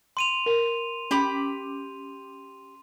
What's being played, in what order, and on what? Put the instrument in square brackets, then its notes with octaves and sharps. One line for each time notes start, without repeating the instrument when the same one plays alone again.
[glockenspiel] C6 D#7 F7
[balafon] A#4
[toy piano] C#4 [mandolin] G4 B5 D6